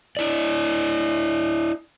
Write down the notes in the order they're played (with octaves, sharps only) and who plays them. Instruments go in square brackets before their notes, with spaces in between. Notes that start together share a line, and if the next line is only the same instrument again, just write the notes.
[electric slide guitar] D4 E4 D5